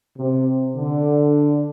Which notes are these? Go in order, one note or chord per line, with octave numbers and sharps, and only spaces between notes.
C3
D3